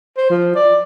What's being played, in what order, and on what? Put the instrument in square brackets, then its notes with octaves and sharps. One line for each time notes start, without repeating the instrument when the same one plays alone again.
[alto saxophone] C5
F3
D5